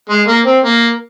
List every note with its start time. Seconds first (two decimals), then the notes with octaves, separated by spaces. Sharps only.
0.10 G#3
0.28 A#3
0.46 C4
0.64 A#3